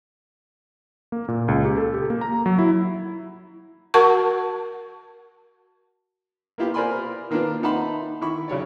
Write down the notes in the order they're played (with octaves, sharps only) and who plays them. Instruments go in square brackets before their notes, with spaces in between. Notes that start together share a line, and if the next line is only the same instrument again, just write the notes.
[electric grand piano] A#3
A#2
C#2
G4
A4
G4
A#3
A#5
F#3
E4
[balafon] F#4 A#4 F#5 A5 C#6
[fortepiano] A#3 B3 E4 F4 G4
A#4 C5 D5 G#5 B5 C6
D#3 A#3 B3 D4 F4 B4
D#4 E5 F#5 A5 B5 C6
D#3 E4 B5 C#6
C#3 F#3 C#5 D5